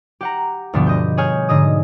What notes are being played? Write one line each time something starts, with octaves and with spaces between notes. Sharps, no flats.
G4 F#5 A#5
D2 G2 B2 F3 B3 D4
D#5 G6
G#4 C#5 G#5 F6 G6
G#2 D3 D#5 D#6